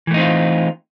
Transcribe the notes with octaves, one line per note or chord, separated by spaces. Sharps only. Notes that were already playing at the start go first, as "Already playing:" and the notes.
E3 A3 C4 D#4 F4